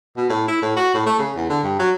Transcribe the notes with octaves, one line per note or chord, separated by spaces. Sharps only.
B2
A2
E4
A2
F#4
A2
A3
C#3
E2
D3
G2
F#3